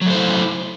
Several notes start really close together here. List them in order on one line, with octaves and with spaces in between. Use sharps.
F#3 A3 C5 E4